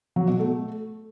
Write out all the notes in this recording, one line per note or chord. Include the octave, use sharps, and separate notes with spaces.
F#3
B2
A3